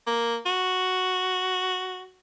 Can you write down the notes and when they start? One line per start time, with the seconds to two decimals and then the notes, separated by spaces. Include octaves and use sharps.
0.07 A#3
0.46 F#4